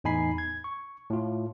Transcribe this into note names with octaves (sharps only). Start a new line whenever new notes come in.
E2 A2 D#4 G#5 B5 C7
G#6
C#6
A2 F4